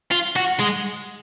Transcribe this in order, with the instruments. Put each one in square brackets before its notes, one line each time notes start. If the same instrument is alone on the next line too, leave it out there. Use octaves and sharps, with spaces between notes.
[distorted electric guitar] F4
F#4
G#3